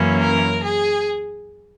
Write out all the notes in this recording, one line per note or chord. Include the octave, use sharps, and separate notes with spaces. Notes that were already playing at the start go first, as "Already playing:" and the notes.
Already playing: F#2 E3 A#3 C#4
A#4
G#4